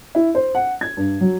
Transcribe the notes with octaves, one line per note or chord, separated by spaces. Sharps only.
E4
C5
F#5
G#6
G2
F#3